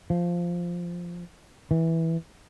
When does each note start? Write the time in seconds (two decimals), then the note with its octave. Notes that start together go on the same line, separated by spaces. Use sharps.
0.10 F3
1.71 E3